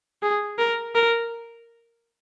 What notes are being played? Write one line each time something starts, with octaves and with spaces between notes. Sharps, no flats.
G#4
A#4
A#4